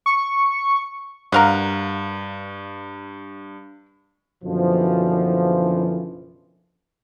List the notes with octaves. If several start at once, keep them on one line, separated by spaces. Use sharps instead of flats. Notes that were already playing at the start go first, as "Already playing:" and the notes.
C#6
G2 A#4 F5 F#5
F#1 F#2 B2 D3 E3 F3